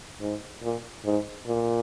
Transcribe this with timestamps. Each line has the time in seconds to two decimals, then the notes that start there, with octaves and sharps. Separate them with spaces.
0.21 G#2
0.62 A#2
1.04 G#2
1.46 A#2